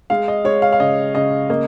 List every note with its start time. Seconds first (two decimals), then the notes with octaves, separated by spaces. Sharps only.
0.10 G#3 F5
0.28 D#5
0.45 G#3 C#5
0.62 F5
0.73 F5
0.80 C#3 D#5
1.15 C#3 D#5
1.50 A#3 D#5